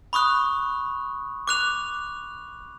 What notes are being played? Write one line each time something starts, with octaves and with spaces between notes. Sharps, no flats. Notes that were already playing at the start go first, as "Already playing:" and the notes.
B5 C#6 D#6 F#6
D6 F#6 F7